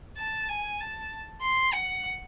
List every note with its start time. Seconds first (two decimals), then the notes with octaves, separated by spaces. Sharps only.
0.17 A5
0.48 G#5
0.80 A5
1.42 C6
1.73 F#5